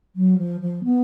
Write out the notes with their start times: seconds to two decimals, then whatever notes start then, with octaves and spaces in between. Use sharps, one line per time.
0.16 F#3
0.38 F3
0.61 F3
0.84 B3